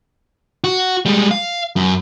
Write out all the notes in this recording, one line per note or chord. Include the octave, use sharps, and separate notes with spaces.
F#4
G3 G#3
F5
F#2